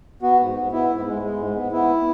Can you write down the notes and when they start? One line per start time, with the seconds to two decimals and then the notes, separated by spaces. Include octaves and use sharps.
0.22 B3 F#4
0.40 G#2
0.55 B3
0.72 B3 E4
0.89 G#2
1.06 G#3
1.22 G#3
1.39 G#2
1.55 B3
1.72 B3 E4